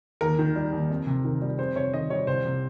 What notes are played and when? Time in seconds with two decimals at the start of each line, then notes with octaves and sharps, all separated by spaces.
0.21 D#2 A#4
0.39 D#3
0.56 G3
0.72 D#2
0.90 F2
1.07 C3
1.24 D#3
1.42 G3
1.58 F2 C5
1.76 C3 C#5
1.93 D#3 D#5
2.10 G3 C#5
2.27 C2 C5
2.45 C3